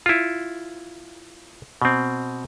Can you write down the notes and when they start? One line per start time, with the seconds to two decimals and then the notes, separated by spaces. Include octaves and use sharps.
0.06 E4 F4
1.82 B2 C4